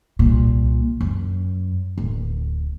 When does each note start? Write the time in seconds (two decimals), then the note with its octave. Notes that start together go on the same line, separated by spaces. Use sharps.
0.19 C2 A#2
1.01 F#2
1.98 D1